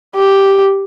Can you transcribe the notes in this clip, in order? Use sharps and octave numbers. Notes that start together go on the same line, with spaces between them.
G4